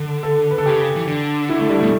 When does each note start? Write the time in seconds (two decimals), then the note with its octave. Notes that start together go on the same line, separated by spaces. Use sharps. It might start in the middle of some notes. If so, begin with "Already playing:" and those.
Already playing: D3
0.23 A4
0.51 B4
0.58 A4
0.66 C#3 G4
0.96 E3
1.07 D3
1.49 E4
1.59 A3
1.69 G3
1.79 A3
1.82 B2